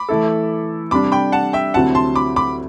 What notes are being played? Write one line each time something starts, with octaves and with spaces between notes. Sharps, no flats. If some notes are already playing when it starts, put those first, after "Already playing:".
Already playing: B5 D6
E3 A3 E4 A4
C3 G3 D4 B5 D6
G5 B5
F#5 A5
E5 G5
D2 C3 F#3 C4 E4 F#5 A5
A5 C6
B5 D6
B5 D6